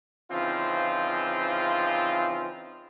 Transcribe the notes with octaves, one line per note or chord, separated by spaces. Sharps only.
C#3 E3 F3 C4 D#4 F4